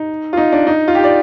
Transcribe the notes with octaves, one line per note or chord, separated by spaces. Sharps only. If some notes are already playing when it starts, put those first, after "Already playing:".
Already playing: D#4
F4
D#4
D4
D#4
F4
G4
D5